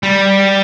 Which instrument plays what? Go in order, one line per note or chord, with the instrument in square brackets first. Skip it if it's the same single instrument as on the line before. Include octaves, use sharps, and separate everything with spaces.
[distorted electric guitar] G3